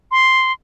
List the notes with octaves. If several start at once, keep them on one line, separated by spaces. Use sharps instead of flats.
C6